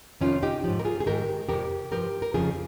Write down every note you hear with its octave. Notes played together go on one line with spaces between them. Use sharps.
F2 C3 D#3 C#4 F4
D#4 G4
G#2 F3
A#4
F4 G#4
G#4
G#2 D#3 G4 A#4
F2 C3 F3 G4 A#4
G2 F3 G4 A#4
A#4
F2 C#3 F3 F4 G#4